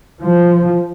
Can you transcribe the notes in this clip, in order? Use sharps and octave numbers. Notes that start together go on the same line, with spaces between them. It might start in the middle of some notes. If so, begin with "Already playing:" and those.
F3